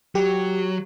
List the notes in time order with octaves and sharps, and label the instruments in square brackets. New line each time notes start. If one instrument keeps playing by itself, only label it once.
[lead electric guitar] F#3 [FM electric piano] G4